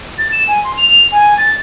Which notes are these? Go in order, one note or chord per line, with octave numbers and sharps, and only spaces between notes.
A6
E7
G#5
C6
F7
G#5
A6